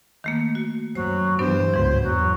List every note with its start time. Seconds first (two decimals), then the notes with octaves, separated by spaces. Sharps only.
0.24 D#3 A3 A#3
0.55 F#4
0.95 F#2 F#3 C5
1.39 G2 E3 F#3 B3 D4 C5
1.74 C#2 G#2 E3 F#3
2.03 E2 F#3